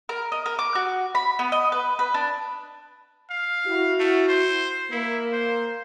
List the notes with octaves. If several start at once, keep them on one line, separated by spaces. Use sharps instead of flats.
A#4
D#5
A#4
D6
F#4
B5
B3
D#5
B4
B4
D4
F5
E4 F#4
A3
C5
A#3 E4
C5